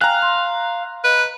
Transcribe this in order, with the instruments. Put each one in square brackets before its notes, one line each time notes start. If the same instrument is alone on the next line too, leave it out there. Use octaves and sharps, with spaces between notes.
[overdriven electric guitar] F5 [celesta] G5 G#5 [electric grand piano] A#5 F#6
[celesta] C6
[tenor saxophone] B4 [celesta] D#5